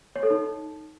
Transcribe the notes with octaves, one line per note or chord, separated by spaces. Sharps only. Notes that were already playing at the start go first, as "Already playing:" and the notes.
C#5
A4
D#4